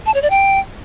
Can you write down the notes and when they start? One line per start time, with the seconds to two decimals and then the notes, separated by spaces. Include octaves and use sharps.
0.06 A5
0.14 C#5
0.22 D5
0.30 G5